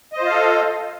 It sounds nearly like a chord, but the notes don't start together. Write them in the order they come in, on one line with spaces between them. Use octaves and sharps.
D#5 C5 F4 F5 A4